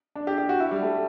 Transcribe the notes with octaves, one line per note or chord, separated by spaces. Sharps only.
D4
G4
G4
F#4
E4
G3
A3